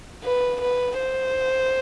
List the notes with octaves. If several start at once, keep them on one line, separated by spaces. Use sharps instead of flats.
B4
B4
C5